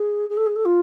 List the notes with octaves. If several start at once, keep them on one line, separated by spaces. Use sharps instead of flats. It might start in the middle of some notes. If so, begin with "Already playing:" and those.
Already playing: G#4
G#4
A4
G#4
A4
F4